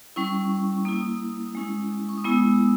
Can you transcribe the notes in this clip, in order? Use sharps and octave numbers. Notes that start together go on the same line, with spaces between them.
G3 C#4 E4 C#6
A#3 E4 D#6
G#3 C#4 E4
C#6
D#6
G#3 B3 E4 E6